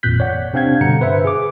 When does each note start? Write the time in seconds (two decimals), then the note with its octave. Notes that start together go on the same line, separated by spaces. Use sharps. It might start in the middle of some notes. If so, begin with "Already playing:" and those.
0.03 G#1 F2 A#2 F#6 G6 B6
0.20 C#5 D5 F#5
0.53 C3 C4 D4 F5 G6 G#6
0.81 G2 B2 D3 F#5 A#5 C#7
1.01 B4 C5 E5
1.25 G#4 D6